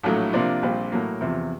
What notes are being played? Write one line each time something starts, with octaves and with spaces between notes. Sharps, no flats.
A#1 A2 F#3 A3
C3 F3 A#3 D4 F4
A#1 A#2 G3 C4 F4
A2 F#3 A#3
E2 C3 F3